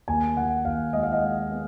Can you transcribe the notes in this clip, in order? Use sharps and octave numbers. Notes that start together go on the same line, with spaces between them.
D#2 G#5
D#3 F#5
D#2 F5
G#3 D#5
F5
D#5
G#3
B3